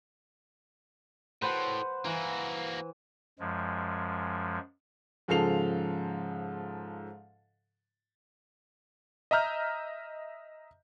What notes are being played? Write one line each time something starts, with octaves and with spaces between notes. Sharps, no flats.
A2 B4 C5 F#5
E3 A#3 F#4
F#2 F3 G#3
G#2 C#3 F3 A4 C7 F7
D#5 E5 A#5 F6 G6